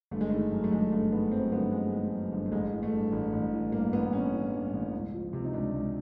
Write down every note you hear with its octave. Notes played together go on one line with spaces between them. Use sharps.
G1 A3
G#3
D#3 A3
F#2
A3
G1 G#3
G1 A3
D#3 B3
F#2 C4
G1 B3
G1 G#3
D#3 G#3
F#2
G1
A3
A1 G#3
E3
A3
G2
A1
A1
E3
G2 A#3
A1 B3
A1 C#4
E3
G2
A1
C#2
F3
C3
D#4
C#2 D4
C#2